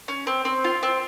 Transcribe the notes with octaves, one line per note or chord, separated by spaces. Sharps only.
C#4
C4
C4
F4
C4